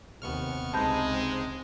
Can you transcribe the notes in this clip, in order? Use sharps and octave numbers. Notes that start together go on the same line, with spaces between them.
D#2 C3 B3 C#6 F6
C#2 C3 G#3 C4 D#4 A5 B5 G6